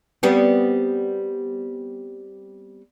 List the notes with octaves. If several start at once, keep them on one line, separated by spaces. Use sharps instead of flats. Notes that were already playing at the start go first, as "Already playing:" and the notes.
G3 B3 C4